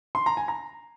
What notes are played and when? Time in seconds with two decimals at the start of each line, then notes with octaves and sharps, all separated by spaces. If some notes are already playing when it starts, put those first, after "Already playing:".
0.15 C6
0.26 A#5
0.37 G#5
0.48 A#5